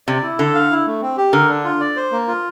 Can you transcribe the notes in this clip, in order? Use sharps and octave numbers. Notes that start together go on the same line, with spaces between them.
C3 D5
E4
D3 A4
F5
E4
A3
C4
G4
D3 A#4
D4
F4
D5
C5
A#3
F4